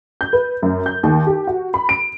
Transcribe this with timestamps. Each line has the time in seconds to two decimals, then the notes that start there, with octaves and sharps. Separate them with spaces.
0.21 G6
0.33 B4
0.62 F#2
0.86 G6
1.03 D#2
1.27 G4
1.47 F#4
1.74 B5
1.89 D7